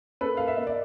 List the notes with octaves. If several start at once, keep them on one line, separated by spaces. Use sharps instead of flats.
A#3 A4 B4
A#3 F5
E5
A#3 D#5
D5